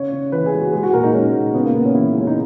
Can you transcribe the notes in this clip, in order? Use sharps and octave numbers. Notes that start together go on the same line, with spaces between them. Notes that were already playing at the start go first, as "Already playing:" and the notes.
Already playing: C#3 C#5
C#3
E3 B4
G#4
G#3
F#4
G#3 G#4
F#4
A#2 A#4
D#4
G#3 C#4
A#2
C#3 B3
A#3
C#3 B3
C#4
E3 E4
G#3 C#4
D#4